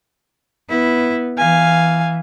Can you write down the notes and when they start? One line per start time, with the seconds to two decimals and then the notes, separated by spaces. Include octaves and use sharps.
0.69 B3 E4
1.37 E3 F5 G#5